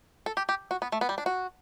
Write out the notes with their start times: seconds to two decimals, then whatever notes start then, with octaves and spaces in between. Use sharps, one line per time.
0.26 A4
0.37 G4
0.49 G4
0.71 F#4
0.82 B3
0.92 A3
1.01 B3
1.09 G3
1.18 D4
1.26 F#4